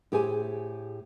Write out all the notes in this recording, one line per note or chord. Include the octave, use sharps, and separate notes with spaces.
A2 G4 G#4 C5 G#5